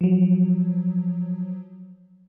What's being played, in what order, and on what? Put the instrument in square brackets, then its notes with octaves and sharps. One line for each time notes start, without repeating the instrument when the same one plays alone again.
[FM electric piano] F3 F#3